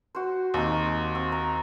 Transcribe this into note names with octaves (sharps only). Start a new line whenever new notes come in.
F#4 C5
D#2 C4 D#4
C4
A#5